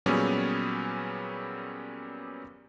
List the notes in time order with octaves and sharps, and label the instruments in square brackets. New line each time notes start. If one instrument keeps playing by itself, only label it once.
[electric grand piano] A#2 F#3 G3 B3 C#4 G#4